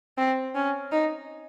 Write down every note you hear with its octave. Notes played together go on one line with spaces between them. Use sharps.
C4
C#4
D#4